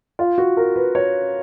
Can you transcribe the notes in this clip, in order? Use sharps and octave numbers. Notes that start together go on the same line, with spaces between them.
F4
F#4
A#4
B4
C#5